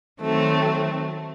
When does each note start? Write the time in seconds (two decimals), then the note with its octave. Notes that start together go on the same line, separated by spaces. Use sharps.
0.21 D#3 F#3 A3 C4